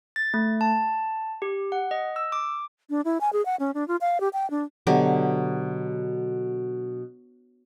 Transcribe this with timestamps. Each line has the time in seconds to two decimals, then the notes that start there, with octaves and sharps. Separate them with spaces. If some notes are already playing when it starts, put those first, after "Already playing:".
0.16 A6
0.34 A3
0.61 A5
1.42 G4
1.72 F#5
1.91 D#5
2.16 E6
2.32 D6
2.90 D4
3.05 E4
3.21 G#5
3.33 G#4
3.45 F#5
3.60 C#4
3.74 D4
3.88 F4
4.01 F5
4.20 G4
4.33 G5
4.51 D4
4.87 B2 D3 F#3 G4